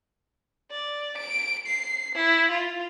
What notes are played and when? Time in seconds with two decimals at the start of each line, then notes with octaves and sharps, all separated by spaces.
0.71 D5
1.17 D7
1.66 C7
2.15 E4
2.50 F4